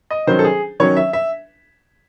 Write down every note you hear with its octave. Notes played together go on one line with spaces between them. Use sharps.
D#5
D#3 F#3 C#4 C5
A4
G#4
D#3 F#3 C#4 C#5
E5
E5